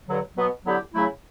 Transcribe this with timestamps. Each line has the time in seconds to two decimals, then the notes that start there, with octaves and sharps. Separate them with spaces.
0.08 G2 D3 F#3
0.36 B2 F#3 B3
0.65 D3 F#3 B3 E4 G4
0.94 C#3 F#3 A3 E4